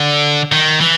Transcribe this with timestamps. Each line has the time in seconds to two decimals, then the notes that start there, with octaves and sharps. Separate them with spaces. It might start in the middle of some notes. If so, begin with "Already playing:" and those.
Already playing: D3
0.52 D#3
0.81 E3